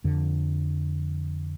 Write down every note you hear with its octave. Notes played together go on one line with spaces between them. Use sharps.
F2 D3 F3